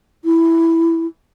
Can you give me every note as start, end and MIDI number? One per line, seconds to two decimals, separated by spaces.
0.25 1.06 64